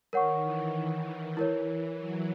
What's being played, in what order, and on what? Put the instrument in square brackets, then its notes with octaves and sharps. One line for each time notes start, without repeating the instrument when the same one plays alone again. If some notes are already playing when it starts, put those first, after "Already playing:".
[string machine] D#3 [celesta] A#4 C#5 F#5 C#6
[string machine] E3
D#3
D#3
[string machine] E3 [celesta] E4 A#4 C#5
[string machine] F#3